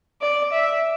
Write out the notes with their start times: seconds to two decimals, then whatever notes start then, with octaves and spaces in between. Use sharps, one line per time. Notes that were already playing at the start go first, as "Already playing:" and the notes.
0.22 D5
0.53 E5